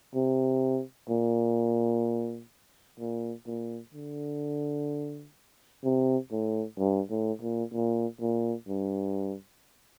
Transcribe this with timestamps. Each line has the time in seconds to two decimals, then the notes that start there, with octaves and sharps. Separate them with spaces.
0.15 C3
1.10 A#2
2.99 A#2
3.47 A#2
3.94 D3
5.84 C3
6.31 A2
6.79 G2
7.10 A2
7.42 A#2
7.73 A#2
8.21 A#2
8.68 G2